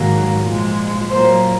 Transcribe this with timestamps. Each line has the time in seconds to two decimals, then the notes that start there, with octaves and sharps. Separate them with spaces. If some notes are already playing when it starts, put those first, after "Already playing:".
Already playing: G#2 D#3 F#3 A#3
0.44 A#2 F3 G#3
1.11 A#2 F#3 A#3 C5